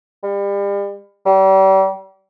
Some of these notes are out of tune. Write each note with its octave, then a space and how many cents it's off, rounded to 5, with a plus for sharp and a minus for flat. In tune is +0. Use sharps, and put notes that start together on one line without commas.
G3 +35
G3 -35